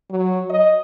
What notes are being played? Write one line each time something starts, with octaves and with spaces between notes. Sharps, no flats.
F#3
D#5